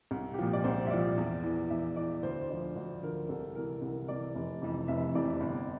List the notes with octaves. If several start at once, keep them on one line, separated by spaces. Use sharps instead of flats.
C2
G4
A#2 F3 F4
D5
C2 C5
E5
A#2 F3 D5
E2
E3
E2 E5
E3 D5
D2 C5
D3 F3 D5
D2 D5
D3 F3 A#4
C2 A4
C3 E3 A#4
C2 A#4
C3 E3 D5
F1
F2 C3 E3
F1 E5
F2 C3 E3 D5
G1